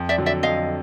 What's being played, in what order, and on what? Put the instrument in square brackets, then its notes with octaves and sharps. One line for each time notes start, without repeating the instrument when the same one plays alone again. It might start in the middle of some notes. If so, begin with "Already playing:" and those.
Already playing: [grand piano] F2
[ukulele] D5 E5
[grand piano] D3 F#3
[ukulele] D5 E5
[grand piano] F2 [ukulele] D#5 F5